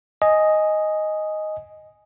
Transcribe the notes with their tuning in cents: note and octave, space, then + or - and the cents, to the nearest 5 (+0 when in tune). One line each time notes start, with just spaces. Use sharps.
D#5 +0 G#5 +0